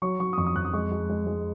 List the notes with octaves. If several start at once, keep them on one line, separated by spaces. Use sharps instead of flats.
F#3 C#6
F#3 C#6
D#6
F2 C#6
D#6
F2 F#6
D#6
G#3 C#6
G#3
G#3
G#3